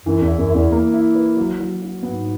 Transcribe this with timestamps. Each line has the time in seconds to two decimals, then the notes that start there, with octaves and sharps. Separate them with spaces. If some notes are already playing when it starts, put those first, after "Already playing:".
0.05 F#2 E3
0.22 E2
0.27 E4
0.39 F#2
0.49 E4
0.55 E2
0.72 A#3
0.94 E4
1.15 B4
1.37 F#3
1.60 F#3
1.82 F#4
2.03 G#2 B3